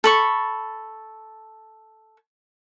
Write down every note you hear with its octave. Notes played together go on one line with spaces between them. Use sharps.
A4 B5 C#6